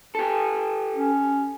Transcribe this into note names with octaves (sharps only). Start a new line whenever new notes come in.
G4 A4
C#4